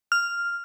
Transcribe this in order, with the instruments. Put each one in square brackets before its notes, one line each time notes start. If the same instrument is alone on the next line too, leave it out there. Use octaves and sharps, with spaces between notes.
[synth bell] F6